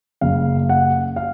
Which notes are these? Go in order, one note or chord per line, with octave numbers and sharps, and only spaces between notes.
F#1 F#2 C#3 F5
F#5
F5